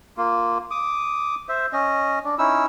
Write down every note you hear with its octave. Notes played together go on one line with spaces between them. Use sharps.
A#3 F4
D6 D#6
C5 E5
C#4 D#5
D4
C#4 D#4 E4 E6